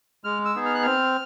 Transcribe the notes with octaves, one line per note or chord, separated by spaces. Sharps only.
G#3 F6
E6
B3 D#4 G#4
F6
F#6
C4 F6